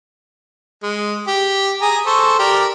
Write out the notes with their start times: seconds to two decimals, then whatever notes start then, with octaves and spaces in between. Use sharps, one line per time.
0.83 G#3
1.27 G4
1.81 G#4 A#5
2.06 A4 C5 C#6
2.39 G4 A#4 D5